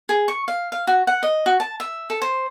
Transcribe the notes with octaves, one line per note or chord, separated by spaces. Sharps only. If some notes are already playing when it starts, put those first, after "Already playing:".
G#4
C#6
F5
F5
F#4
F#5
D#5
F#4
A5
E5
A4
C5